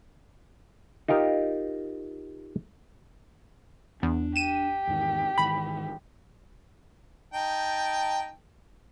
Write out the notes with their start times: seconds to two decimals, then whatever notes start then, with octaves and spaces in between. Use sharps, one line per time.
1.08 D#4 F4 G4 A#4
4.03 E2 D4
4.36 G4 D#7 E7
4.87 E2 G#2 D#3
5.38 G#2 D#3 E3 B5
7.34 D#4 G5 A5